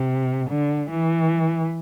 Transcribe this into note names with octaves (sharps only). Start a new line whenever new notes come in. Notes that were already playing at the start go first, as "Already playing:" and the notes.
Already playing: C3
D3
E3